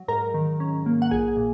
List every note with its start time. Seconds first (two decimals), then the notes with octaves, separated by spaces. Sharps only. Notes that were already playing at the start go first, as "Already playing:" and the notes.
Already playing: F#3
0.08 G#2 A#4 A#5
0.34 D#3
0.60 C#4
0.86 A#3
1.02 F#5
1.11 A#1 G#4 G#5
1.37 A#2